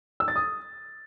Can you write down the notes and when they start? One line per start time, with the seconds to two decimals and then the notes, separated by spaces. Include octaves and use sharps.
0.20 E6
0.28 A6
0.36 D#6